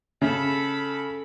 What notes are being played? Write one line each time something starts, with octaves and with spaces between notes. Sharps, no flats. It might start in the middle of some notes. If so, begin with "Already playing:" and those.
C#3 A4 B5